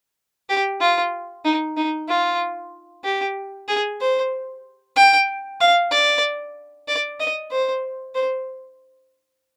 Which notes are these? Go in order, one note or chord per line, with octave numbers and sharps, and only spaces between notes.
G4
F4
D#4
D#4
F4
G4
G#4
C5
G5
F5
D5
D5
D#5
C5
C5